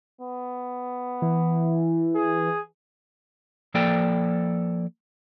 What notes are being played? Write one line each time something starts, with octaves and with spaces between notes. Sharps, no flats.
B3
E3
G#4
F3 A#3 A4 D5 G5